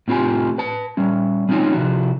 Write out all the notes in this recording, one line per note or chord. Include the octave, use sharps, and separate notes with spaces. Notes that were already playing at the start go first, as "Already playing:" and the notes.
A2 C4 F4 G4 G#5
B4 A5
G3 C#4
G#3 C4 C#4 D#4 F4
C3 F3 F#4